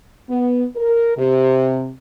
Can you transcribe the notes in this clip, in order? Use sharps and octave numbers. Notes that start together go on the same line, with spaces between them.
B3
A#4
C3